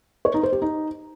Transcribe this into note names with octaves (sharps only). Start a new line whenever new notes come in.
C#5
D#4
C5
G4
D#4